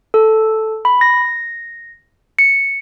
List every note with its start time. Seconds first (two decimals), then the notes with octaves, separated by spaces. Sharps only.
0.14 A4
0.85 B5
1.01 A#6
2.39 C#7